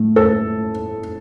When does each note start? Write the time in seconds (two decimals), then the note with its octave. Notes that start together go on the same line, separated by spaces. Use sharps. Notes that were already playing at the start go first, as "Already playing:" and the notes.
Already playing: A2 A3
0.16 A4